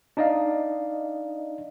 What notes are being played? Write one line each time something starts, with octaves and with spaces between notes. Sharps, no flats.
D4 D#4 D5 D#5 F5